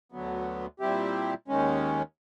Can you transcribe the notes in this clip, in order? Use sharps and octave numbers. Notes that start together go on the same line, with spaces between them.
D2 D3 F#3 B3
A#2 G3 C4 E4 G4
D#2 D#3 G#3 C#4